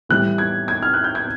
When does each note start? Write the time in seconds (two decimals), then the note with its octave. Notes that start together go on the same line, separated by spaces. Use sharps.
0.09 A2 E3 G3 F#6
0.38 G#6
0.68 G#6
0.83 F6
0.94 F#6
1.04 G6
1.15 G#6